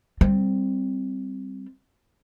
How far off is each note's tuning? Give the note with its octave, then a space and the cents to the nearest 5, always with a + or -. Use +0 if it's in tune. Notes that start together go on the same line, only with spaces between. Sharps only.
G3 +0 C4 +0